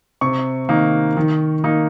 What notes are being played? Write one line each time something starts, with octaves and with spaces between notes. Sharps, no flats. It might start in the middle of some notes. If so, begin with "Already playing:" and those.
C3 C#6
D#3 A#3 D#4
D#3
A#3 D#4